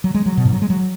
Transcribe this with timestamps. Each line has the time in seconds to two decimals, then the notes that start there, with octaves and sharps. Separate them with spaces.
0.04 F#3
0.14 G#3
0.26 F#3
0.37 B2
0.45 G#2
0.53 F#3
0.62 G#3
0.70 F#3